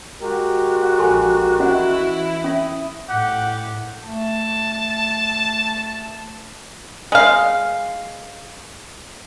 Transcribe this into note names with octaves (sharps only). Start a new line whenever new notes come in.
G#3 F#4 G4 A#4
A#1 A4 G#5 C6
E3 C#4 E4 D#5 F#5
C#4 E5 D#6
A2 G4 F#5
A3 A5
G#3 F5